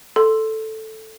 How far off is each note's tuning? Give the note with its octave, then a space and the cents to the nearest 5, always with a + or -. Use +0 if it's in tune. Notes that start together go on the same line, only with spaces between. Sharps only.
A4 +0 C6 +0